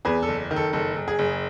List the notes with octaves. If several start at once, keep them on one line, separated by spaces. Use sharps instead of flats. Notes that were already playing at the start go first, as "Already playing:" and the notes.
E2 G#4 B4
A4
F#1
D#3
A4
F#1 A4
F#1
G#4
F#1